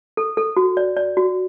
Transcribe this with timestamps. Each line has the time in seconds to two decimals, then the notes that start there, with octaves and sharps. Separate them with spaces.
0.17 A4
0.37 A4
0.57 F#4
0.77 D5
0.97 D5
1.17 F#4